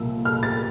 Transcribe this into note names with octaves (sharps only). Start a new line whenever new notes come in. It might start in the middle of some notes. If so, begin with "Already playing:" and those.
Already playing: C2 A#2 F3 E6
F6
A6